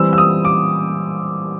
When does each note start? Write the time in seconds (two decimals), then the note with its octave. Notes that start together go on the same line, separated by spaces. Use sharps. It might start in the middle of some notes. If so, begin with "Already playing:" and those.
Already playing: E3 G3 C4 E6
0.13 E6
0.18 D#6
0.45 D6